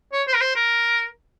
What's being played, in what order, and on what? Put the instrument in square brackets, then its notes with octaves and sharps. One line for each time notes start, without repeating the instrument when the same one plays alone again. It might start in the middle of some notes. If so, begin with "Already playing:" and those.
[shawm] C#5
C5
A#4
C5
A#4